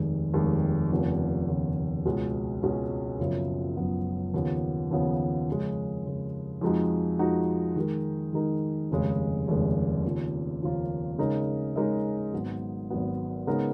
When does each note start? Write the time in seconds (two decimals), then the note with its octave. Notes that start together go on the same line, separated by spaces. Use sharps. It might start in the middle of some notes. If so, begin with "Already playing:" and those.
Already playing: F1 D#2 D#3 G#3
0.34 F1 D#2 D#3 G#3
0.91 F1 D#2 C#3 F3 B3
1.48 F1 D#2 C#3 F3 B3
2.05 C#2 B2 G#3 C#4
2.63 C#2 B2 G#3 C#4
3.19 F#1 F#2 C#3 F3 B3
3.77 F#1 F#2 C#3 F3 B3
4.34 D#2 C#3 F3 B3
4.91 D#2 C#3 F3 B3
5.48 F2 C#3 G#3
6.05 F2 C#3 G#3
6.61 F2 F3 G#3 D#4 F#4
7.19 F2 F3 G#3 D#4 F#4
7.76 D#3 G#3 D#4 A#4
8.33 D#3 G#3 D#4 A#4
8.90 F1 D#2 C#3 G#3
9.47 F1 D#2 C#3 G#3
10.04 D#2 C#3 F3 A#3 F4
10.62 D#2 C#3 F3 A#3 F4
11.18 C#3 G#3 D#4 A#4 D#5
11.76 C#3 G#3 D#4 A#4 D#5
12.33 G#1 G#2 F#3 B3
12.90 G#1 G#2 F#3 B3
13.47 C#3 G#3 B3 D#4 A#4